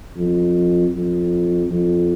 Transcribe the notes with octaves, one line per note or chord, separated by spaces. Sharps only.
F2
F2
F2